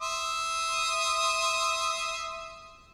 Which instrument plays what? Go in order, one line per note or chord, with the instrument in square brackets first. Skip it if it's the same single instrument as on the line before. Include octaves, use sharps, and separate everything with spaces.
[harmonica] E5 C6 D#6